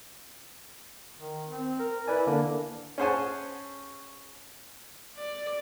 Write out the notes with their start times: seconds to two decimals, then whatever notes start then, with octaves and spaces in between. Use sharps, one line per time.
1.19 D#3
1.49 C4
1.79 A#4
2.08 E4 B4 D5 G#5
2.27 D3 A#3 D4
2.98 C#4 G#4 C5 F#5 G#5 A5
5.18 D5